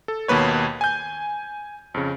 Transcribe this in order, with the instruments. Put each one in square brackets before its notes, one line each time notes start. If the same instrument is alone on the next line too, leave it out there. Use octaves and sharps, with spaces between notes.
[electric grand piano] A4
D#2 B2 A#3 B4 C#5
G#5 G6
F2 C#3